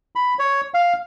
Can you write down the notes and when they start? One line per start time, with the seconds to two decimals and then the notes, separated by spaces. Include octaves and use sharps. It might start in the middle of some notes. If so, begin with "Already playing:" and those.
0.16 B5
0.39 C#5
0.74 F5